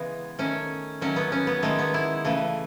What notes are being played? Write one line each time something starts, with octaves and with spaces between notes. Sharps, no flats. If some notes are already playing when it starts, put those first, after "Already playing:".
Already playing: C#3 E3 G#3 B3
D#3 A3 C#4
D#3 F#3 A3 C#4
B3
C#4
B3
D#3 G#3 A3
B3
E4
C#3 E3 A3